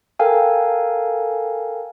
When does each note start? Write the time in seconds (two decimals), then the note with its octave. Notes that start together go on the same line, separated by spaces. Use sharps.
0.19 A4 A#4 F5 G5 G#5